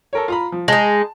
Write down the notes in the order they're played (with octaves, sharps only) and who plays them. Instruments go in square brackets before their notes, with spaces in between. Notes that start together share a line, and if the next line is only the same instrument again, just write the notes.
[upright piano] A4 A#4 C#5
F4 A#5 B5
F3
[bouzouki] G#3 D#4 [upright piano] A5